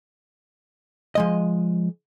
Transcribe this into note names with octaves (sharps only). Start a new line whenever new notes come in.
F3 G#3 D#5